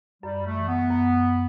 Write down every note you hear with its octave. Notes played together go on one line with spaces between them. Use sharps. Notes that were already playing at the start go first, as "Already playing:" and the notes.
F#2 G3
A3
E3
B3
F#2